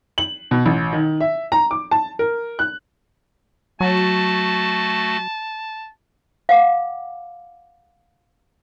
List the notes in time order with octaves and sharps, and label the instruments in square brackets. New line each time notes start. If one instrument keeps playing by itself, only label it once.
[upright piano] F#7
B2
A1
D#3
E5
A#5
D6
A5
A#4
F#6
[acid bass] F#3 [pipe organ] A3 F#4 [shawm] A5
[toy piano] F5 F#5 D6